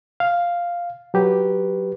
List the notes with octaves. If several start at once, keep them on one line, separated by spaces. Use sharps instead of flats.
F5
F#3 G4 B4